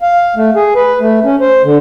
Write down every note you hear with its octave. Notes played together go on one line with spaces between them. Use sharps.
F5
A3
G#4
B4
A3
C#4
C5
D3